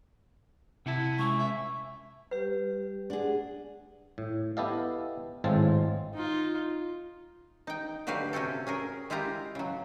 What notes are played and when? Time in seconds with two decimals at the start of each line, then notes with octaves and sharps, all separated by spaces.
0.86 C3 C4 E4 F#5 A5
1.19 G#3 C#4 G#5 C#6
1.39 E5
2.31 G3 G4 B4
3.10 D4 G#4 D5 F#5
4.18 A2
4.57 B3 E4 G4 A4 D#5 F5
5.44 G#1 A2 G#3 C4 F5 A5
6.14 D#4 F4
7.67 D#4 G5
8.07 D3 F#3 F#4 G4 B4 F5
8.33 C3 C#4 F#4 G4 A4
8.67 C#4 G#4 A#4
9.10 G#3 E4 F4 G4 A#5
9.55 C#3 F#3